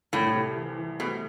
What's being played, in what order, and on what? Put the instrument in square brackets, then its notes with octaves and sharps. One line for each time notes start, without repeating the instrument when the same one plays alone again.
[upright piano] C2 [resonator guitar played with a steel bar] A2
[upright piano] C3
E3
E3
[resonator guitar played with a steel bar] B2 [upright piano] A3